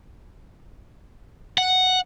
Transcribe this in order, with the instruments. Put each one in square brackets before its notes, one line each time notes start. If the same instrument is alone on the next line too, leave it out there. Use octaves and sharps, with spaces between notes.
[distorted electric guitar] F#5